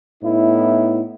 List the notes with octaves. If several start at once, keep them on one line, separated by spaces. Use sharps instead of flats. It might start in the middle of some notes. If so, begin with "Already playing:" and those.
A2 B3 D#4 E4